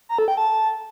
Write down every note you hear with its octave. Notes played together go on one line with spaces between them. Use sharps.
A#5
A4
G5
A5